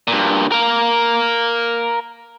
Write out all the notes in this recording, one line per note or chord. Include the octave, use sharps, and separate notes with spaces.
G2 A#2
A#4 F5